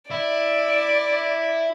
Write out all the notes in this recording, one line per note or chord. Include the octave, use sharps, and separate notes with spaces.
E4 D5